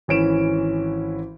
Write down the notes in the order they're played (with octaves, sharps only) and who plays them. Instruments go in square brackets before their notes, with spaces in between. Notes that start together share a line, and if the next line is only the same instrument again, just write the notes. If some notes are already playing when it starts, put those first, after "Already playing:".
[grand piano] G#1 E3 C#4 D7 E7